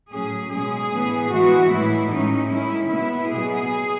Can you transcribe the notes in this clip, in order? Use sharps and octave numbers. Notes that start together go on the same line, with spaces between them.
A2 F#3 C#4 G#4
B2 G#3 C#4 G#4
A2 E3 B3
E3 G#3 B3 F#4
A2 E3 G#3 E4
A2 G#3 C#4 D#4
D#3 G#3 C#4 E4
B2 G#3 B3 E4
B2 F#3 B3 G#4